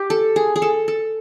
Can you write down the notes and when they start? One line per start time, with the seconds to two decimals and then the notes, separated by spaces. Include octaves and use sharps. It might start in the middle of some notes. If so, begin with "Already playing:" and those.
Already playing: G4
0.10 A4
0.36 G#4
0.56 G#4
0.62 A4
0.88 A4